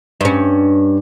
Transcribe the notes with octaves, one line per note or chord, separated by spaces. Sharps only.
G2 C#4